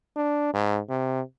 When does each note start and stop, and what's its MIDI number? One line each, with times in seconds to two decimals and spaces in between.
0.16 0.53 62
0.53 0.79 44
0.89 1.21 48